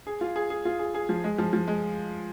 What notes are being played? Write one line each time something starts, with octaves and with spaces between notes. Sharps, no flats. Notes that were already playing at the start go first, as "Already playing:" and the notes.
G#4
F4
G#4
G#4
F4
G#4
G#4
F3
G#3
F3
F3
G#3